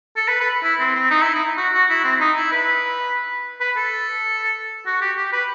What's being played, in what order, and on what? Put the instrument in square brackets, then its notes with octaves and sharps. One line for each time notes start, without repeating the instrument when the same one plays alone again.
[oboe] A4
B4
B4
E4
C4
C4
D#4
E4
D#4
F#4
F#4
E4
C4
D#4
E4
B4
B4
A4
F#4
G4
G4
B4